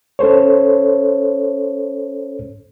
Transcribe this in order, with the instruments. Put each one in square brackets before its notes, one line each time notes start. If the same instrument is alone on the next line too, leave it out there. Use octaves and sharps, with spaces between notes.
[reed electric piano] C#4 A4 C5 C#5